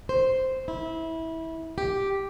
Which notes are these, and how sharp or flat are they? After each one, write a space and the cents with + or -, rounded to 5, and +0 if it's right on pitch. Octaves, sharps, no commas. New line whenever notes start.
C5 -5
E4 -20
G4 +0